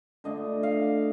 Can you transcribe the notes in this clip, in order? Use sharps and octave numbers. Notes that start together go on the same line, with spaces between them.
D3 A3 D4 F4 D#5
F5